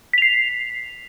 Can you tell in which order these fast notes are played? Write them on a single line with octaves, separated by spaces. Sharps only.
B6 F7 C7